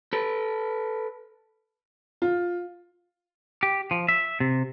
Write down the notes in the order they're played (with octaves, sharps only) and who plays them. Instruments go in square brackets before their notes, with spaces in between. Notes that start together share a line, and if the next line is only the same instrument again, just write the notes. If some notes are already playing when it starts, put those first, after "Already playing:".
[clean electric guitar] A4 B4
[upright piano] F4
[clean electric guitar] G4
F3
E5
C3